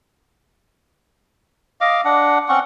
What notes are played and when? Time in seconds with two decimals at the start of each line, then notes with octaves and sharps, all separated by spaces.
1.81 D#5 F5 D6
2.05 D4 F#5
2.49 C4 C#4 F#5 C#6